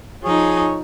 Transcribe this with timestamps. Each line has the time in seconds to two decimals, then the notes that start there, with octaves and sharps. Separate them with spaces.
0.23 F3 D#4 G#4 C#5